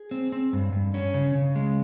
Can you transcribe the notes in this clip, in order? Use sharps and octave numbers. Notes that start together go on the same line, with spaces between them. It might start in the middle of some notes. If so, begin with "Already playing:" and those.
Already playing: G#4
C4
C4
G2
G2
C#4
C#3
C#3
G#3